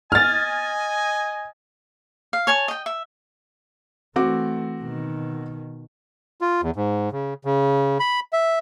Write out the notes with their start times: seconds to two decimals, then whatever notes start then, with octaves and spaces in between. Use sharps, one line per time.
0.12 D#5 G#5 F6 A6
2.33 F5
2.47 C#5 G#5 A5
2.68 D#5 G5
2.86 E5
4.16 E3 A3 C4 F#4 D6
4.81 B2 D#3
6.41 F4
6.63 E2
6.76 G#2
7.12 C#3
7.45 C#3
8.00 B5
8.33 E5